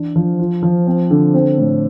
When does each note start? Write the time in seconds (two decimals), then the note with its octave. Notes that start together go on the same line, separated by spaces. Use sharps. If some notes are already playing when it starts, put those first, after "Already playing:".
Already playing: E3 D4
0.16 F3
0.39 F4
0.63 F3
0.87 C4
1.11 D3
1.34 C4
1.58 A2